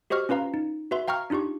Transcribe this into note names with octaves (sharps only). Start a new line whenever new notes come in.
F#4 G4 C5 D#5 C#6 F6
C#4 F4 B4 F5 A#5
D#4
F#4 B4 E5 C6
F5 G5 A#5 C#6 F6
D4 D#4 F4 G4 C#6